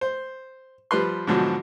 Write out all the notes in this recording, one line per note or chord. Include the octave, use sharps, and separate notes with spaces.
C5
F3 G3 B4 C6
G#2 B2 D3 F3 F#3